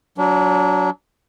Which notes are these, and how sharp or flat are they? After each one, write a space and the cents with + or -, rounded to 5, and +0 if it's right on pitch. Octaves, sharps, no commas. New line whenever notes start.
F#3 +0 D4 -30